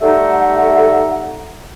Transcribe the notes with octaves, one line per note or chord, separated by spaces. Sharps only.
G3 A3 D#4 A4 E5 F#5